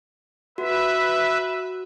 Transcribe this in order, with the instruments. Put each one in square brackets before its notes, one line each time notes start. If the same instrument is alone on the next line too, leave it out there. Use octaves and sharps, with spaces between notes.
[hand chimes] F#4 [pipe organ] B4 E5